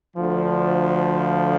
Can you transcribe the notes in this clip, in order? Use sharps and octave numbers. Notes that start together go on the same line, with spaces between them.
D2 D3 F3